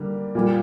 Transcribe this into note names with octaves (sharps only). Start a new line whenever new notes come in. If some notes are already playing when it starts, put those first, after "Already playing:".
Already playing: D3 G3 A#3
A#2 G3 A#3